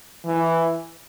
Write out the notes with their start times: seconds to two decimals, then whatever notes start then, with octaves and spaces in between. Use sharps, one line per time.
0.26 E3